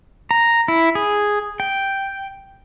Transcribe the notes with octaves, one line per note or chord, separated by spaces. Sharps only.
A#5
E4
G#4
G5